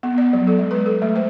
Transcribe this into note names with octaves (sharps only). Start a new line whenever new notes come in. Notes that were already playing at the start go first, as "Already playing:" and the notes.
B3
D5
F#3
A4
G#3
B4
A4
A3
C5